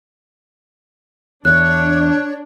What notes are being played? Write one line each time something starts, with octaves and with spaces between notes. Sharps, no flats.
E2 D4 C#5 F#6